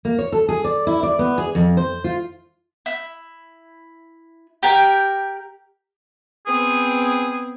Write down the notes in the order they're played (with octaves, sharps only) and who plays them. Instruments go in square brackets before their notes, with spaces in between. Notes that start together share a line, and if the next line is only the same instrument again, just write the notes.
[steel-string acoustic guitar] A#3
C#5
A4
G#4
D5
E4
D5
B3
G#4
F2
C5
F4
[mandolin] E4
G4 A#4 G5
[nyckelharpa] B3 C4 [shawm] G#4